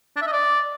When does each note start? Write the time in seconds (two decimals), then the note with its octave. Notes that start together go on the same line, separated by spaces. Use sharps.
0.16 D4
0.22 E5
0.27 D#5
0.33 D5